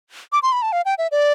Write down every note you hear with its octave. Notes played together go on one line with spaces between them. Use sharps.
D6
C6
B5
A5
F5
G5
E5
D5